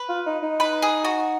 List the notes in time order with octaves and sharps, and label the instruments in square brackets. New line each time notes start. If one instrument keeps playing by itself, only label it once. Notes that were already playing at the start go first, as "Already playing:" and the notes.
Already playing: [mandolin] B4
[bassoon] F4
D#4
D#4
[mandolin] B4
G#4
F#4